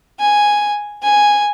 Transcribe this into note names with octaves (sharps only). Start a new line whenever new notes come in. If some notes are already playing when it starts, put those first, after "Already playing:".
G#5
G#5